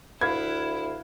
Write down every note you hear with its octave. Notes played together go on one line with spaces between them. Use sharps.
D2 E4 B4 F5 G#6